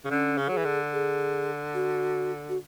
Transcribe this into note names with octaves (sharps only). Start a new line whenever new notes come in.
C#3
D3 C#4
C#3
F#3 G#4
E3
D3
G#4
F#4
F#4